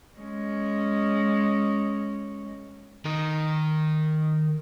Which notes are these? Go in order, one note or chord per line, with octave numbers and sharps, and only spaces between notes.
G#3 C#4
D#3 A#4